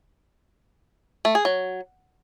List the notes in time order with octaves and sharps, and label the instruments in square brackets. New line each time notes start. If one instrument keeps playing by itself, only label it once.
[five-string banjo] A3
G#4
F#3